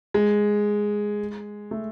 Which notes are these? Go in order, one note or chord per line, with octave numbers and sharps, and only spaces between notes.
G#3
A3